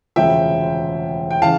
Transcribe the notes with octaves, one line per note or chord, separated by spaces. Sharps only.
E1 D2 C#3 F3 E5 G5
G5
C#3 E3 F5 A5